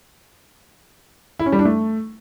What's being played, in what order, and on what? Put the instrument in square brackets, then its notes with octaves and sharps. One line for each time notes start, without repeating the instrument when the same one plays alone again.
[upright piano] E4
C#4
G3
D4
A3